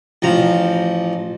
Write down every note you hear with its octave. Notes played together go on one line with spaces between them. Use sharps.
A1 F3 A#5